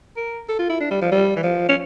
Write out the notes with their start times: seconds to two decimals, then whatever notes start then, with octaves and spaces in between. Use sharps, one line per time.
0.17 A#4
0.49 A4
0.59 F4
0.69 E4
0.80 D4
0.91 G3
1.01 F3
1.12 G3
1.36 E3
1.43 F3
1.69 C#4